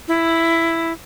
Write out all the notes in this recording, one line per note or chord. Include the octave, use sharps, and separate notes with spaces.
E4